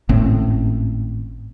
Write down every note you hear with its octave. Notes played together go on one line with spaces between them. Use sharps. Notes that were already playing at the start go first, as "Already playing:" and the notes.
G#1 A2 C4 C#4